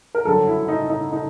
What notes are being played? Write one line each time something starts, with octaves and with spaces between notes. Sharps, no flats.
A#4
G1 F#2 D3 F#3 A4
E4
D#4
D#4
D#4